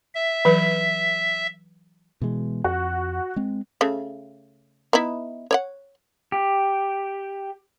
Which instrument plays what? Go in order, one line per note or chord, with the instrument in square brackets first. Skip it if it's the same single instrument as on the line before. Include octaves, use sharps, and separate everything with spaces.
[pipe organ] E5
[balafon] E3 F#3 B4
[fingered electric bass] B2 E3 G#3
[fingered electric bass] F2 [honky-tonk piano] F#4
[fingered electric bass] G#3 C4
[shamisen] C#3 A3
B3 D#4 E4
C#5 D5 F#5
[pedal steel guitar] G4